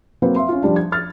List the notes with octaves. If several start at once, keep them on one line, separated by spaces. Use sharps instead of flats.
F#3 A#3 C4 B4
E5 F5 C6
C#4 F4
F3 G3 D4
G#6
F6 A6